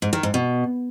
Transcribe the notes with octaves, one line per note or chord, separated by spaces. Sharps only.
G#2
D#3
G#2
B2